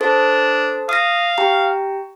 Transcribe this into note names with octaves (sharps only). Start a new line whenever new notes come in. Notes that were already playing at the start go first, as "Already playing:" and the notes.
D4 A4 C5
F5 D#6 A#6
G4 G5 A#5